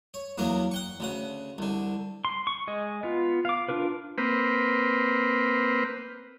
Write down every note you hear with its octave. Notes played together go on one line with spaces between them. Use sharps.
C#5
E2 F#3 A#3 B3
F#5 G5 C#6
D2 C#3 F#5
C2 D3
C6
C#6
G#3 D#5
B3 F4
F5 D6
D4 F4 A#4 B4
A#3 C4 B4